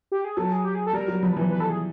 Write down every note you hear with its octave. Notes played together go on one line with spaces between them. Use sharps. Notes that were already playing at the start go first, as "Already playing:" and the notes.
G4
G#4
F#3 A4
G#4
G4
G#4
A4
G3 A#4
F#3
F3 B4
E3 B4
B4
A4
G#4